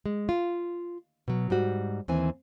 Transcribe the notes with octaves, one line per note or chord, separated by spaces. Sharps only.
G#3
F4
B2 F#3
G#2 G3 F#4
D#2 E3 C4 G#5